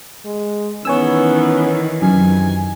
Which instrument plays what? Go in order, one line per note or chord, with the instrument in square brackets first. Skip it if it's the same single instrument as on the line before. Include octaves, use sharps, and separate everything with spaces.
[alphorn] G#3
[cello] D#3 E3 [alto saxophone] B3 [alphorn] C#4 [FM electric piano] C#5 G#5 E6
[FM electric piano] F#2 [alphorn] C3 [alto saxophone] G#5